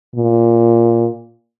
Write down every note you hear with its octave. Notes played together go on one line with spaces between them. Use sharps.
A#2